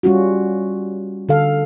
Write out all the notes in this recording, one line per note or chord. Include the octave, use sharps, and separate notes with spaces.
G3 C#4 F4 F#4
D3 A4 F5